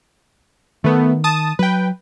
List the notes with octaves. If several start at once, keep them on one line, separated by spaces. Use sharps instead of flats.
D#3 A3 B3
A5 D#6
F#3 B4 G5